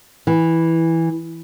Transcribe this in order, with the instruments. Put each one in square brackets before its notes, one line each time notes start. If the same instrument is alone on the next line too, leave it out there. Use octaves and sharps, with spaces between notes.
[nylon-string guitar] E3